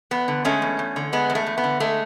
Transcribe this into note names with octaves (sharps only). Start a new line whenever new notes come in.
E2 B3
D3
G#3 A3 C#4
E2
E2
D3
G#3 B3
E2
A3
E2
B3
D3
G#3 A3